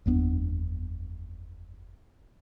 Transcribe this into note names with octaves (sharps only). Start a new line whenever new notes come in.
F#1 E2 B3 D4